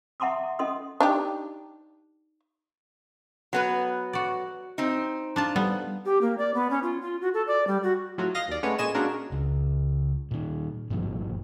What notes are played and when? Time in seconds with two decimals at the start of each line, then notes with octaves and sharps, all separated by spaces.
0.20 E5 F#5 A#5 C6 D6 D#6
0.59 C#4 A4 D#5 C6 D#6
1.00 D4 D#4 G4
3.53 F#3 B3 B4
4.13 F#4 D5
4.78 C4 D#4
5.36 D4 F4 A5
5.56 G3 B3
6.05 G4
6.22 A#3
6.38 D5
6.54 B3
6.71 C#4
6.83 F4
7.02 F4
7.21 F#4
7.34 A4
7.48 D5
7.67 G3
7.83 F#4
8.18 A2 F#3 F4 F#4
8.35 D#5 F5 A#6
8.48 D#2 D5
8.63 G#3 A3 B3 C#4 C#5
8.78 A#2 G#3 D#5 G#5 E7
8.94 G#3 A#3 C#4 D4 F#4 A#4
9.32 C#2
10.31 A#2 D#3
10.90 G#1 G2 A#2 F3